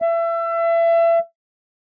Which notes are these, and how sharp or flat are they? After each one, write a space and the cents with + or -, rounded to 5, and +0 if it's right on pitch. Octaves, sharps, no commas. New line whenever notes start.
E5 +30